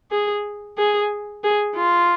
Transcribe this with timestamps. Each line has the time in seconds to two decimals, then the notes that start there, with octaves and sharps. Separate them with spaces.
0.11 G#4
0.78 G#4
1.44 G#4
1.76 F4